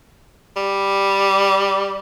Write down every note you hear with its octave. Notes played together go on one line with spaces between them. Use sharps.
G3